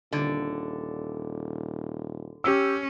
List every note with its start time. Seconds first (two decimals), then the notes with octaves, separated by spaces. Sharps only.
0.12 D#1 D3
2.44 C#4 G4 E6